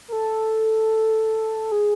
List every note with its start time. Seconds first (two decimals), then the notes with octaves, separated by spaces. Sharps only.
0.08 A#4
0.13 A4
1.72 G#4